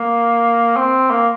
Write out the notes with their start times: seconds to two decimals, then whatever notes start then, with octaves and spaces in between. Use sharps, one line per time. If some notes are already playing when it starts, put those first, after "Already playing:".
Already playing: A#3
0.77 C4
1.11 A#3